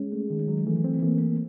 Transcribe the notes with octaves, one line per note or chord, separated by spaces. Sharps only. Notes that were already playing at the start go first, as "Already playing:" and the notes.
Already playing: G#3 C#4
A3
D#3
F#3
E3 A3
C4
E3 A#3
A3